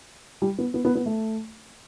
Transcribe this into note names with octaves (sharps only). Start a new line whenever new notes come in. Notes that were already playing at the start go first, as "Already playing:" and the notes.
G3
B3
B3
B3
B3
A3